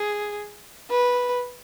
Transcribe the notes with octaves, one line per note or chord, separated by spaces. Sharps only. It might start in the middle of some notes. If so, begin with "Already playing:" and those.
Already playing: G#4
B4